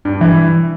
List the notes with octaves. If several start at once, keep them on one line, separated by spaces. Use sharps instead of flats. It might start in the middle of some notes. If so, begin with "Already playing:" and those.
G2
E3